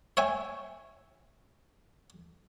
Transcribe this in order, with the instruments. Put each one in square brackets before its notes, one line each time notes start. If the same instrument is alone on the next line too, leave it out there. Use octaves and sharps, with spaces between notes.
[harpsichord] C#5 E5 G5 G#5